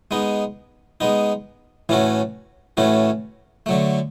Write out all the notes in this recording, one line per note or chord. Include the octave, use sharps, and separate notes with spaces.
G#3 B3 D#4
G#3 B3 D#4
A2 E3 A3 C#4 F#4
A2 E3 A3 C#4 F#4
D3 F#3 A3